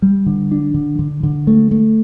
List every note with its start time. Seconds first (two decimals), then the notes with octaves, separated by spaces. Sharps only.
0.02 G3
0.26 D3
0.51 D4
0.74 D3
0.99 D3
1.23 D3
1.47 A3
1.71 A3